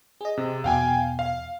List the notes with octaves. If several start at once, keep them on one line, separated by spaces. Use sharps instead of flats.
G#4 D#5
C3
E2 B2 F5 G5 G#5
F5